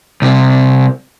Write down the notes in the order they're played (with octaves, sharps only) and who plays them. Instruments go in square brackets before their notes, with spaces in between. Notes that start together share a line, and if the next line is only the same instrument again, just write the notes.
[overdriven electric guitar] C2 C3